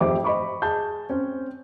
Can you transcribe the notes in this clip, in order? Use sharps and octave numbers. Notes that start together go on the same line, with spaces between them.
F2 G#2 G4 C5 E5 D6
C5 D#5 B5 C#6 D6
G#4 A5 G6
C4 C#4